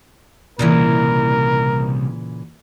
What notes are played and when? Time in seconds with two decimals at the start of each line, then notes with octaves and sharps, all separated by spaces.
0.59 C2 A#2 C#3 E3 A#4